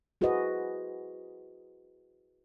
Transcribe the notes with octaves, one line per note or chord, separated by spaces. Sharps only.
E4 F#4 G#4 B4 C5 D#5